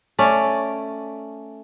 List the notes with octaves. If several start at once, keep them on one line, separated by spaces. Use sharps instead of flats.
A3 C#4 D5